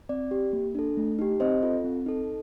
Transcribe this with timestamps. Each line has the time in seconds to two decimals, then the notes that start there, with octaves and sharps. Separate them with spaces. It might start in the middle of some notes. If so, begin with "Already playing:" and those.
0.09 C4 D5
0.31 G4
0.53 A#3
0.75 D4 A4
0.97 A3
1.19 D#4 G4
1.40 C4 C5 D#5
1.62 F4 A4
1.84 C4
2.06 D#4 A4